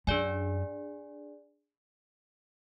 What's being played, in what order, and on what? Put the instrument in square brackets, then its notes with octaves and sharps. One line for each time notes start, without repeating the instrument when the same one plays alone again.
[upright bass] F#2 [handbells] D4 G#4 D5 G#5